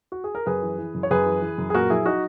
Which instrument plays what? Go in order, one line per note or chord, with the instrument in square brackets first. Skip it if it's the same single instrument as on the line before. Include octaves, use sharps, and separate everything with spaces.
[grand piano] F#4
G#4
A#4
F#2 G#4 B4
E3
E3
F#2
C#5
F#2 G#4 B4
E3
E3
F#2
G#4
A#2 F#4 A#4
F#3 E4 G#4
F#3 D#4 F#4